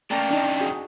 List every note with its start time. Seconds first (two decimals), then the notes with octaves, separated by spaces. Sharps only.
0.11 A3 A#3 C#4 D5 G5 A5 A#5
0.31 F2 D#3 D4 D#4
0.60 F#4 G#4